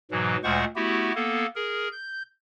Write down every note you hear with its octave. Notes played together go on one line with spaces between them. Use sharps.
G#2 B2 E3 F#3
D2 A#2 G#3 C5 F#5 C#6
A3 B3 E4 F#4 G4
A#3 B3 A4
G#4 A#4
G6